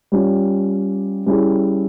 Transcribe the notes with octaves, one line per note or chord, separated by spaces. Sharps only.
G3 C#4 F4
G3 C#4 E4 G#4